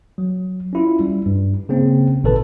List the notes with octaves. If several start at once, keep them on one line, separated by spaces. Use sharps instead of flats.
F#3
C#4 E4 F4
G3
G2
C#3 A#3 C4
G#1 A#2 D#3 A4 B4 A5